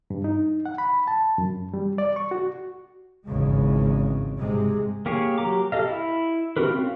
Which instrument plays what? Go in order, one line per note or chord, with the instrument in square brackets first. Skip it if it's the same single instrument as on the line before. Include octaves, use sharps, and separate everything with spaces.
[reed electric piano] G2
D#4
F#5
B5
A5
F#2
G3
D5
C#6
F#4
[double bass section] G#1 E2 C#3 G#3
G#2 C3 G#3
[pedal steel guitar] A#3 G4 G#4 C#5
F#3 G4 A#5 D6
G4 A4 D#5 F5
E4
C4 F#4 G4 A#4 B4
C4 C#4 F4